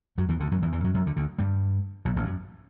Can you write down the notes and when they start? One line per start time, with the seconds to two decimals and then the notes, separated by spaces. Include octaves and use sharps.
0.18 F#2 F#3
0.29 E2 E3
0.40 D2 D3
0.51 F#2 F#3
0.62 E2 E3
0.72 E2 E3
0.84 F#2 F#3
0.94 F#2 F#3
1.06 D2 D3
1.16 D2 D3
1.38 G2 G3
2.05 B1 B2
2.16 A1 A2
2.23 G2
2.26 F#2